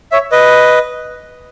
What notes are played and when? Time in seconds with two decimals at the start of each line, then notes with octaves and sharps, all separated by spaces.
0.12 C#5 E5
0.32 B4 D#5